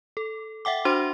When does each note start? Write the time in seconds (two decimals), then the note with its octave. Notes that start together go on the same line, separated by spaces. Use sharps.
0.17 A4
0.65 E5 F#5 G5 D6
0.85 D4 F#4 C5 C6